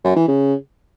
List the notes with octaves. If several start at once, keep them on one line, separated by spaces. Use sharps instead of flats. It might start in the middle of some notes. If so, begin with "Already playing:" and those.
F#2
E3
C#3